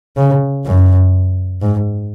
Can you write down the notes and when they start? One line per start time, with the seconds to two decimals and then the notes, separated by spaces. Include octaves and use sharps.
0.17 C#3
0.66 F#2
1.62 G#2